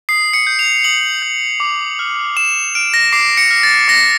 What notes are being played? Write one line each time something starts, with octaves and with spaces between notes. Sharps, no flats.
D#6 C7
C#7
G6
F7
D#6 F#7
G6
D6
F6
D6 E7
F6 D7
A#6
D6 C7
C#7
F6
A6
D6 A#6